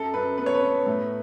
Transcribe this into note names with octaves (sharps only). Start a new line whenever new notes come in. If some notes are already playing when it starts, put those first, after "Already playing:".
Already playing: F#2 A4
F#2 B4
B3 B4
C#5
B4
B3
A2